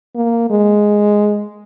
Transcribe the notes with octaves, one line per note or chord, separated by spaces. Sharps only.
A#3
G#3